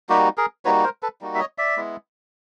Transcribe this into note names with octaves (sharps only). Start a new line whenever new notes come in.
G3 A#3 D#4 F#4 G4
G#4 A#4
G3 A#3 D#4 F#4 B4 C#5
A#4 C5
A4 B4
G3 A#3 D#4 F#4
E5
C#5 D#5
D5 E5
G#3 B3 E4